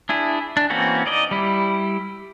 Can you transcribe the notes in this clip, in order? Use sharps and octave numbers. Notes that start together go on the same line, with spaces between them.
D4 E4 G#4
D4
E3 A#3 C4 C#4 F#4
D#4 D5 D#5
G3 E4